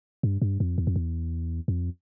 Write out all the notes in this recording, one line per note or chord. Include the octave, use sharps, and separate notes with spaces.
G2
G2
F2
E2
F2
E2
F2